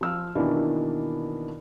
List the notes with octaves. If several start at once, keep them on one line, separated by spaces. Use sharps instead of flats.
F3 E6 F6
B2 D#3 E3 A#3 D4 E4